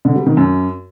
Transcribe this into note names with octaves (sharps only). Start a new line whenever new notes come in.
D3
G3
D#3
F#2